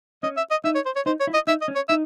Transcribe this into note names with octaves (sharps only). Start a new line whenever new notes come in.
C#4 D#5
E5
D#5
D#4 E5
C#5
C5
C#5
D#4 C5
C#5
E4
D#5
D#4 E5
D#5
C#4
C#5
D#4 E5